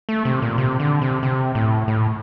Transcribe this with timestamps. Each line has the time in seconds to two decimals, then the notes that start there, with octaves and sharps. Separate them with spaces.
0.09 A3
0.25 C3
0.42 A#2
0.58 C3
0.80 D3
1.02 C3
1.23 C3
1.55 A2
1.88 A2